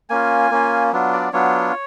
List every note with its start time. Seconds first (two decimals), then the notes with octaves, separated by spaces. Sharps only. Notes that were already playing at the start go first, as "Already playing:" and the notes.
0.10 A#3 C#4 F4 G#5
0.51 A#3 C#4 F4
0.92 F#3 B3 D4 F4
1.13 D5
1.33 F#3 B3 D4 F4 C#5